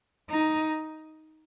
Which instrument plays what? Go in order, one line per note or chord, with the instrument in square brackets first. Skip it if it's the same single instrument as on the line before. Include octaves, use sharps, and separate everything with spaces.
[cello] D#4